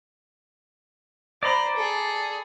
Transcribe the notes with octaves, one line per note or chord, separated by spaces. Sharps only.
C5 D5 A#5 B5
G#4 A4